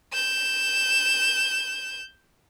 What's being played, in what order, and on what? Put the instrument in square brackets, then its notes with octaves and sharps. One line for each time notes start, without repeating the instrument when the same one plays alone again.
[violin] G6 E7